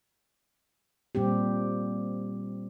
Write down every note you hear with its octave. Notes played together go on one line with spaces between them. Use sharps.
A#2 G3 C4 G4